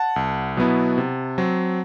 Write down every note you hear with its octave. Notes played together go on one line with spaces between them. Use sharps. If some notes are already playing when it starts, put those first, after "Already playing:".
Already playing: F#5 A5
C2
B2 F#3 B3 E4
C3
F#3 C4